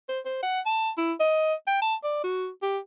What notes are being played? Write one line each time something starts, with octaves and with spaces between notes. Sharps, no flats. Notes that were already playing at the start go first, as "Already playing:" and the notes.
C5
C5
F#5
A5
E4
D#5
G5
A5
D5
F#4
G4